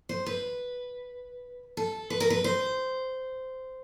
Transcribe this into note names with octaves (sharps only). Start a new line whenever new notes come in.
C5
B4
A4
B4
A#4
B4
C5